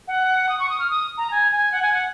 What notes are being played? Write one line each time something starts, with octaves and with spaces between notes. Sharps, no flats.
F#5
D#6
C#6
D#6
F6
D#6
A#5
G#5
G#5
F#5
G#5
F#5